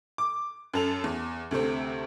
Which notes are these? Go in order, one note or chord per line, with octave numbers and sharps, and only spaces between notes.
D6
F#2 A4 F7
E2
D2 C3 A3 C4